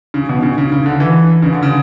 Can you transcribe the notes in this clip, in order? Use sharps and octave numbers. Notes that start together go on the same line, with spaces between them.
C#3
B2
C#3
C#3
C#3
D3
E3
C#3
D3
C#3